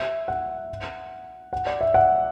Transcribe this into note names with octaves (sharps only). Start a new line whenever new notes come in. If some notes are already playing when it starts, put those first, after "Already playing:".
Already playing: E5
F#5
F#5
D5
E5
F#5